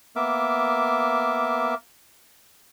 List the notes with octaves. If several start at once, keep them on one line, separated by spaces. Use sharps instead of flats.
A#3 B3 A#4 E5 D6